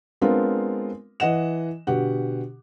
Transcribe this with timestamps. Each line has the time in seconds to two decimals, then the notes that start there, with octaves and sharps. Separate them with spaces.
0.21 G#3 B3 C4 D4 F4 A#4
1.20 E3 D#5 F#5 E7
1.87 B2 D3 G4 F#5